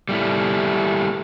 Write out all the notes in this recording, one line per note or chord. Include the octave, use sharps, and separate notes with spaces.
G3 A3 E4